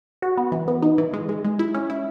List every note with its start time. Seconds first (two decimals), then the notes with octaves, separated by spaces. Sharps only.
0.22 F#4
0.37 B3
0.52 E3
0.68 B3
0.82 D#4
0.98 E3
1.13 G#3
1.29 G#3
1.45 G#3
1.59 E4
1.74 C#4
1.90 E4